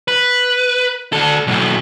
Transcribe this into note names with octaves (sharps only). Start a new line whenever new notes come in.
B4
D2 A4
B1 A2